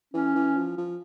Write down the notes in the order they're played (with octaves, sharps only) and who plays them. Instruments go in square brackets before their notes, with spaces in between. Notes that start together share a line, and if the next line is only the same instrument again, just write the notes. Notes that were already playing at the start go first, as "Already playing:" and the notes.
[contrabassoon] E3 [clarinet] C#4
[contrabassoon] E3
F3
F3